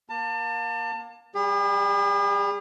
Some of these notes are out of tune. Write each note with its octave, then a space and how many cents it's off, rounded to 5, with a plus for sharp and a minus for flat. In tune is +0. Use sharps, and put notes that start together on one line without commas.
A#3 +25 A5 +30
G3 +0 G#4 -45